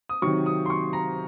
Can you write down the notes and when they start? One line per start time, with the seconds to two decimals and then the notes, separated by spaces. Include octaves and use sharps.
0.09 D#6
0.22 C3 D#3 F#3 C#6
0.46 D#6
0.66 C6
0.70 C#6
0.93 A#5